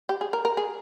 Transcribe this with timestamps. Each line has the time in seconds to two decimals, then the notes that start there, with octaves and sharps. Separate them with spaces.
0.09 G4
0.21 G#4
0.33 A#4
0.45 A#4
0.57 G#4